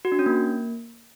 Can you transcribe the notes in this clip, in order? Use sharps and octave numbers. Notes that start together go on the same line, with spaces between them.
F#4
D4
C#4
A#3